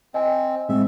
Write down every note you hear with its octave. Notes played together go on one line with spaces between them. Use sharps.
C4 D#5 G5 G#5
A2 G#3 C4 E5